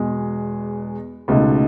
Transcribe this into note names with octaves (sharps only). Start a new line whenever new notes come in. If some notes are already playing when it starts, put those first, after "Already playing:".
Already playing: E2 B2 G#3
C#2 B2 A3 D#4